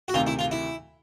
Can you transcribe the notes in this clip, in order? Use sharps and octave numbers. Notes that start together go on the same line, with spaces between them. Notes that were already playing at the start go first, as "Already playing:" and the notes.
F#4
D2 C3 D#3 F4
E4
F4
E4